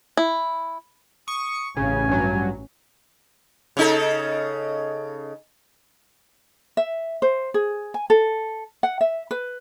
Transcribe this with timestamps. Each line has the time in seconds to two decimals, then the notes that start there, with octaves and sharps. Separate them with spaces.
0.17 E4
1.28 C#6 D#6
1.77 A1 C#3 C#4 G#5
2.08 G2 F#3
3.77 C#3 D#4 A4
6.77 E5
7.22 C5
7.54 G#4
7.94 G#5
8.10 A4
8.83 F#5
9.01 E5
9.31 B4